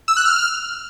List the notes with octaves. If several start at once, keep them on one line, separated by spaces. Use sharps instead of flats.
E6
F#6
F6